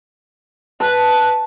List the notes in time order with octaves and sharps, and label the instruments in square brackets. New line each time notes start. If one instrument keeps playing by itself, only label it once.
[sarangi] B4 [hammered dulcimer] A5